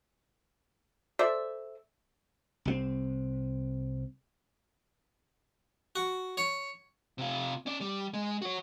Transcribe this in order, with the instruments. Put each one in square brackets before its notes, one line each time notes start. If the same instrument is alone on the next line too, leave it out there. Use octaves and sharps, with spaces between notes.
[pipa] A4 C5 D5 E5
[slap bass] C2 G3 C4
[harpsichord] F#4
C#5
[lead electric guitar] C3 F4
C#4 D5
G3
G#3
F#4 C#5